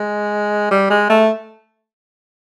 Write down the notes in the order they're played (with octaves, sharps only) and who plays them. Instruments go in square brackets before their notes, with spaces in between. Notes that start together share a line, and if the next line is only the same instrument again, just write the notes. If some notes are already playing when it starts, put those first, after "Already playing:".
Already playing: [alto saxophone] G#3
G3
G#3
A3